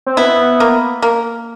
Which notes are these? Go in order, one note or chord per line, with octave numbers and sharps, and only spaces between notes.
C4
B3 E4
A#3
A#3